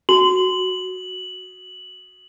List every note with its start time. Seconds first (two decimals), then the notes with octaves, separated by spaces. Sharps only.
0.09 F#4 F#7